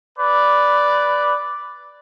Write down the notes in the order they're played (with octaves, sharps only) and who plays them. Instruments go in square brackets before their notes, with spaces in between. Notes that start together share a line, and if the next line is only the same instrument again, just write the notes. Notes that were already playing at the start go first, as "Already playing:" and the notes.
[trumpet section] B4 D5